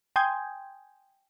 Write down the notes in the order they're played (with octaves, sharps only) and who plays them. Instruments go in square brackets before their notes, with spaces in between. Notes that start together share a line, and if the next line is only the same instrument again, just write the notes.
[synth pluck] G5 G#5 C6 D#6 G6 G#6